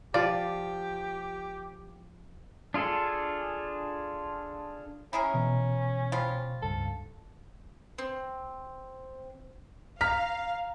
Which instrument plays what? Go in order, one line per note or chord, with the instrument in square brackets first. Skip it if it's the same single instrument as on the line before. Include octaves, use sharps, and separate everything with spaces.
[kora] F3 F4 [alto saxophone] G4 [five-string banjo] D5
[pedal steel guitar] D4 F4 G#4 A4
[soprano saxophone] C#4 [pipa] E4 G#4 A#4
[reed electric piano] B2 [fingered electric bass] E3
[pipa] F3 G3 F4
[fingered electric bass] C#2 G2 [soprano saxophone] A4
[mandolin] C4
[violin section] F5 [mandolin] A#5 [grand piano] F6 B6